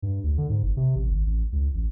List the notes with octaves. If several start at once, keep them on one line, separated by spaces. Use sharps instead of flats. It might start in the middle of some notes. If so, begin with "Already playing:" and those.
G2
D2
D3
G#2
G1
C3
A1
G#1
A1
C#2
A1